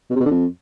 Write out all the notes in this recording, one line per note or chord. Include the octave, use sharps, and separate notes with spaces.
B2
C3
B2
D3
F2